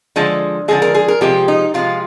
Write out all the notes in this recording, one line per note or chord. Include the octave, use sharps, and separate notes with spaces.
D3 F3 G#3
D3 F3 G#3 G#4
A#4
G#4
A#4
C3 F3 G#3 G4
D#4
C3 F3 G#3 F4